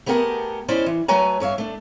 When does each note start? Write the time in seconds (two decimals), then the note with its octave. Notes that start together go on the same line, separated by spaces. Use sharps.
0.06 A3 B3 G4 G#4 A#4 F#5
0.68 C#4 E4 C5 D5 D#5
0.86 E3
1.08 F#3 A3 B4 C#5 G#5 A#5
1.40 G2 C#5 E5 F5
1.58 A3 D4